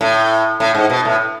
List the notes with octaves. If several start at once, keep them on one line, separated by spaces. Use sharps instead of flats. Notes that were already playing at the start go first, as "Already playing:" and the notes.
A2
A2
G#2
B2
A2